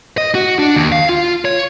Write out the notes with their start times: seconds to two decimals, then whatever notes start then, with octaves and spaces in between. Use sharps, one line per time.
0.18 D#5
0.35 F#4
0.59 D4
0.76 D#2
0.92 F5
1.09 F4
1.45 C#5